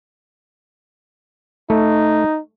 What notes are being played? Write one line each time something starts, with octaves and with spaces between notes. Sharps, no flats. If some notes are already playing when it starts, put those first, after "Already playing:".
A3 D#4